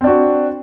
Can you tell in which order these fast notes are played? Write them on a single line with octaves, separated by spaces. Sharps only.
C4 D4 F#4